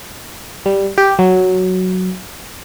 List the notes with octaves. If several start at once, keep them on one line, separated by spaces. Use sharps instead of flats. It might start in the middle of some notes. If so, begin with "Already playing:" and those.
G3
G4
F#3